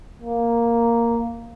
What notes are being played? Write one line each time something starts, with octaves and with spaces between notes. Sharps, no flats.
A#3